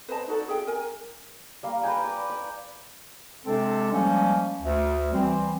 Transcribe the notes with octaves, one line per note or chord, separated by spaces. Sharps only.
B4 C5 D#5 A5
D#4 F#4 A4 D5
G#4 E5 G5
A#4 G#5
G3 A#3 F5
A#4 B4 G5 G#5
D5
D5
C3 G#3 C4 D4 A4
F3 G3 G#3 A#3 C#4
D2
E3 G3 C4